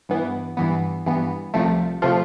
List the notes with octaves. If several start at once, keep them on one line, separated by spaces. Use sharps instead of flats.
G2 E3 B3
G2 E3 B3
G2 E3 B3
C2 C3 F3 A3
C3 F3 A3 F4